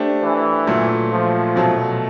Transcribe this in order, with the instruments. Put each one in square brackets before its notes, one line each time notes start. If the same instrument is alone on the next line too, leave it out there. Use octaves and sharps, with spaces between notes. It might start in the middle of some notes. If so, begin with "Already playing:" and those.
Already playing: [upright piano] A3 D4 G4 C5
[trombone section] E3
[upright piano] A#2 F#3 A3
[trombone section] F3
[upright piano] B2 F#3 A3